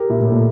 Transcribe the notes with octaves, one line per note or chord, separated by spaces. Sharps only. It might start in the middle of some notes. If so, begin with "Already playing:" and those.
Already playing: G4 A#4
A#2 E4
A2
A#2 A3